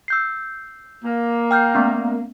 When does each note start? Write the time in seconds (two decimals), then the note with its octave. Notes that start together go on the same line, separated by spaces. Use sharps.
0.08 E6 G6 C7
1.04 A#3
1.51 G5 F6 G6
1.75 A3 B3 C#4